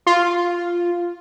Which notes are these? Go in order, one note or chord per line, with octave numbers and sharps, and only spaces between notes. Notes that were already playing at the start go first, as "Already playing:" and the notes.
F4